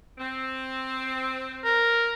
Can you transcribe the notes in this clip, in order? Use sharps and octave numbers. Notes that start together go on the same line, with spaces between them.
C4
A#4